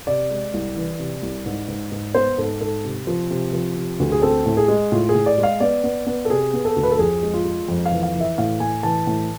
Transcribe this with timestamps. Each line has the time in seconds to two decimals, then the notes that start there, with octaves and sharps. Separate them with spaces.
0.07 C3 D5
0.31 G#3
0.54 C2
0.76 E3
0.99 C3
1.22 C2
1.46 G#2
1.68 G#2
1.92 G#2
2.15 B3 C5
2.38 G#2 A4
2.61 G#2 A4
2.84 C3
3.07 F3
3.31 C3
3.53 F3
3.76 C3
4.00 D2
4.12 G#4
4.22 C4 A4
4.46 A2
4.57 G#4
4.68 G#3
4.92 A2 F4
5.09 G#4
5.15 A2
5.26 D5
5.38 G#3
5.43 F5
5.60 B3 D5
5.84 B3
6.07 B3
6.25 A4
6.30 C3 G#4
6.53 B3
6.65 A4
6.76 D2
6.83 B4
6.91 A4
6.99 F2 G#4
7.23 G#3
7.34 F4
7.45 G#3
7.68 F2
7.86 F5
7.92 E3
8.03 F5
8.14 E3
8.21 E5
8.38 A2 F5
8.60 A2 G#5
8.83 E3 A5
9.07 A2